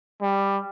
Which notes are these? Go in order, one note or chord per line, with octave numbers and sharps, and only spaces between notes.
G3